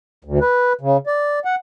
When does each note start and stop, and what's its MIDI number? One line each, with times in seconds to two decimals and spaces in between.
0.25 0.39 38
0.41 0.73 71
0.81 0.97 49
1.07 1.39 74
1.45 1.55 78